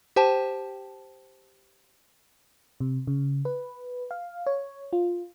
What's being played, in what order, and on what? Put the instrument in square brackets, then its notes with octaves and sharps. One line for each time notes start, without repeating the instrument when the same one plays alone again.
[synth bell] G4 C5 G5 A5
[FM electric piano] C3
C#3
B4
F5
C#5
F4